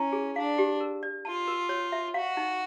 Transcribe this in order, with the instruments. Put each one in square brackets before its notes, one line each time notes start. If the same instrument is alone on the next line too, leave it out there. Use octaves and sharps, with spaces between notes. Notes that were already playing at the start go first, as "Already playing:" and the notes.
Already playing: [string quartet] C#4 [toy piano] E4
[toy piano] G#4
[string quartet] D4 [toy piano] F5
[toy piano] G4
A#4
D5
[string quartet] F4 [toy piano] A5
[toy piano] A#4
C#5
E5
[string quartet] F#4 [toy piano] F5
[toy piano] D#4